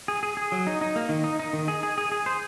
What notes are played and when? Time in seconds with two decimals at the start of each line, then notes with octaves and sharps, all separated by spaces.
0.08 G#4
0.23 G#4
0.37 G#4
0.52 F#3
0.67 D#4
0.81 D#4
0.96 A#3
1.09 D#3
1.24 D#4
1.39 D#4
1.53 D#3
1.68 G#4
1.83 G#4
1.98 G#4
2.12 G#4
2.26 C5